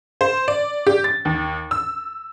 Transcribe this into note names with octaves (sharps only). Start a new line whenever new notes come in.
C5
D5
G4
A6
D#2
E6